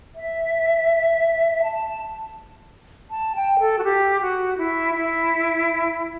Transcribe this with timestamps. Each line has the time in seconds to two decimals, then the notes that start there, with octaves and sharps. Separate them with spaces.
0.16 E5
1.63 A5
3.11 A5
3.36 G5
3.60 A4
3.79 F#4
3.84 G4
4.21 F#4
4.58 E4
4.95 E4